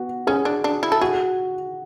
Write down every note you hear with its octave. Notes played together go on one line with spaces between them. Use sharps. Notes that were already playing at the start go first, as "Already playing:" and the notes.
Already playing: B3 F#4
C#4 G#4
D4
D4
E4
A4
F#4 G#4